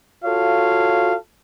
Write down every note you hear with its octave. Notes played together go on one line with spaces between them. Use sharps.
F4 F#4 A4 C#5 F5